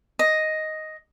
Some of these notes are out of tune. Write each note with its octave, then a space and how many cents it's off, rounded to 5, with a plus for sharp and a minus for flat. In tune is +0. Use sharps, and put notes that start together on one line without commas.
D#5 +5